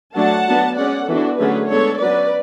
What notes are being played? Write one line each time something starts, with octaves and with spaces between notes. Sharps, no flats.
F#3 A3 D4 F#5 A5
F#3 B3 D4
G#3 C#4 D5 F#5
E3 B3 D4 F#4 A4
D3 F#3 A3 C#4 G#4 B4
G#3 B3 D4 A4 C#5
F#3 C#4 B4 D5